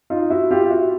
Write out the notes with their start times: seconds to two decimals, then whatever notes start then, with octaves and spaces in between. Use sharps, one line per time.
0.10 D#4 F4
0.30 E4 F#4
0.51 F4 G4
0.64 F4
0.70 E4 F#4